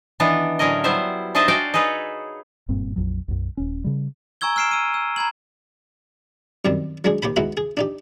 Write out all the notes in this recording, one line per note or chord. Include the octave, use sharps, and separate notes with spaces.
D#3 E3 B3 D4
A2 D3 F#3 C#4 A#4 D#5
F#3 G3 B3 E4 C5 E5
D4 D#4 C5 D#5 E5 A5
F#4 D5 F5 G5 G#5
D#4 G#4 A4 B4 C#5
F#1 G2 A#2 C4
A#1 F2 F#3
B1 F#2
D#1 C#4
C#3 G3
G#5 A#5 C#6 E6 G#6 G7
E6 F6 C7 D7 E7
E6 D#7
E6
A#5 B5 G#6 F#7
F#2 D#3 G3 C4
F#3 G#3 D4 G#4
D#2 G4 C5 B5
G#3 B3 D#4 E4 F#4
G#4
D4 D#4 G4